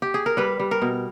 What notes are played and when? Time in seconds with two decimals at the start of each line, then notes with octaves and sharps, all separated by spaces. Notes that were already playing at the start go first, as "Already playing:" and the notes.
0.02 G4
0.14 G#4
0.26 A#4
0.37 G3 B4
0.60 G3
0.71 A#4
0.82 B2